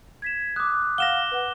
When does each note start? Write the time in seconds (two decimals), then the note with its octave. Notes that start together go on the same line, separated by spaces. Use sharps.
0.22 G#6 B6 E7
0.56 D6 D#6 F#6
0.98 F5 F#5 F6 A#6 E7 G7
1.31 B4 F#5